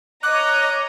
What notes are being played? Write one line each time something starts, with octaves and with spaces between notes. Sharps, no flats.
C#5 D#5 A#5 D6 F#6